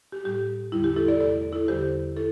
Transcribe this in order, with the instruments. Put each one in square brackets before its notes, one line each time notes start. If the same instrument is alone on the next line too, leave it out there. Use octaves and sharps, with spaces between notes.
[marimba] G4
A2 G3 G4
E2 D3 G3 E4
G4
E4 A4
A4 D5
E2 C3 A3 A4 D5
E4 A4
E2 D3 G3 G4 C5
E4 A4